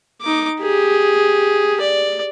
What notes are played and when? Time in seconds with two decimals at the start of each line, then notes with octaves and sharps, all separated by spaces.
0.21 D#4 D6
0.61 G4 G#4
1.81 D5